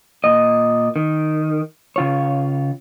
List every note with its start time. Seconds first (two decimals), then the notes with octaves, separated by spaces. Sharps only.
0.24 A#2 D#5
0.96 D#3
1.96 C#3 F4 C#5